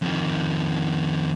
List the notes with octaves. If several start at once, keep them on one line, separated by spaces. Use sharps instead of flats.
F2 D#3